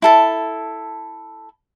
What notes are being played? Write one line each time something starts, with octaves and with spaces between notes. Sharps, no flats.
E4 A4 A5